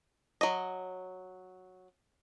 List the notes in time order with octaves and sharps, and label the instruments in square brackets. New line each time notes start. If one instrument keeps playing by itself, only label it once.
[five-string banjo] F#3 D#5